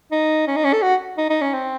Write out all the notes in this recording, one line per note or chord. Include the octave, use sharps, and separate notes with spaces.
D#4
C#4
D#4
C#4
A4
F#4
D#4
D#4
C#4
C4